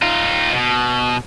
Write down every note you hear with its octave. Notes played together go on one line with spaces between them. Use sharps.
D#4 F4
B2